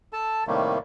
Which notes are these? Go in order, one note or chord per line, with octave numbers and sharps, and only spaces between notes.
A4 A5
A2 C3 D#3 G3 A3 A#3